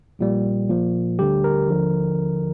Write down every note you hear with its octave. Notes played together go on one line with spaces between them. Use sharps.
A#1 A#2 G3
A#1 A#2 F3
D2 D3 G3 G4
A#4
D#2 D3 F3